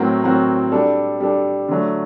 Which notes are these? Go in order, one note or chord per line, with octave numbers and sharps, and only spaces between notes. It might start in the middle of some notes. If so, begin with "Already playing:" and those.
Already playing: A2 F#3 C4 F#4 A#4
A2 F#3 C4 F#4 A#4
G3 D4 A4
G3 D4 A4
D3 F#3 A3